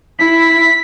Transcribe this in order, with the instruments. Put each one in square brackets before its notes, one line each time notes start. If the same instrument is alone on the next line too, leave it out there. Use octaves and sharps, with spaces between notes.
[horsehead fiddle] E4 [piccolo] B6